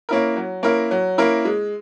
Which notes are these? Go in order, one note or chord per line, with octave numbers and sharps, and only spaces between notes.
A#3 C#4 E4 A#4
F#3
A#3 C#4 E4 A#4
F#3
A#3 C#4 E4 A#4
G#3